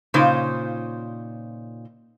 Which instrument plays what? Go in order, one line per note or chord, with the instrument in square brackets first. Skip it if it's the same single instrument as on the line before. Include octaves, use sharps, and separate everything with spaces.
[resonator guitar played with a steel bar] A#2 C#3 D#4 C5